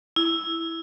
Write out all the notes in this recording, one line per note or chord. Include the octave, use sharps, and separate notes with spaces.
E4